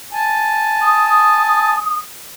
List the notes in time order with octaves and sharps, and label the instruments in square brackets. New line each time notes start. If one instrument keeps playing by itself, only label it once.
[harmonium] G#5 A5
[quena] D#6